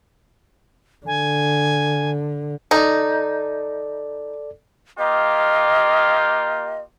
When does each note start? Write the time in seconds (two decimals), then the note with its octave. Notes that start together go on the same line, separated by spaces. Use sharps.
1.07 D3 G#5
2.71 D#4 A4 D5
4.98 A#3 F4 G4 D#5